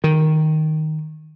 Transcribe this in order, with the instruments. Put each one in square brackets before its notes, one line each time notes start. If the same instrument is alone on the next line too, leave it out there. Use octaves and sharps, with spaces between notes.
[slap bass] D#3